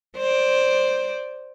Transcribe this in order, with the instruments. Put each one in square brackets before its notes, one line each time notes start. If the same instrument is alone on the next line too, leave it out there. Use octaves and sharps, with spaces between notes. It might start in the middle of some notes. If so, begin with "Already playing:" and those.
[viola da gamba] C5 D5